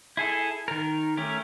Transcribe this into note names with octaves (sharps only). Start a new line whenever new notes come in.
E4 G#4 A4
D#3 A#4
A3 C#4 G4 A#4